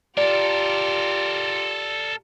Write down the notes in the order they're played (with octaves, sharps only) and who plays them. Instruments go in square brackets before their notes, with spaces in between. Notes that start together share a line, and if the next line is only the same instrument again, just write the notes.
[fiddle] F4 G4 [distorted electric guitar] A4 A#4 [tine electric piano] D5